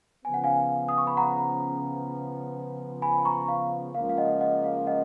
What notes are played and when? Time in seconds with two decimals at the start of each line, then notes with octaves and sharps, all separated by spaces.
0.24 C#3 F3 B3 G#5
0.34 F#5
0.44 F5 G#5
0.89 D#6
0.98 C#6
1.07 B5
1.17 F#5 A#5
3.02 G#5 B5
3.25 A#5 C#6
3.48 F5
3.94 C#2 C#3 F3 A#3 F5
4.09 F5
4.17 D#5 F#5
4.41 D#5 F#5
4.64 F5
4.87 D#5 F#5